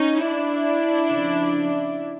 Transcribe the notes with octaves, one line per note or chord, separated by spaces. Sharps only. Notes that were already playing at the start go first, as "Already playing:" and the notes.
Already playing: C#4 D#4
D4 E4
C#3 F3